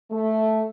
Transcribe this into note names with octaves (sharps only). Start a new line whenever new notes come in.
A3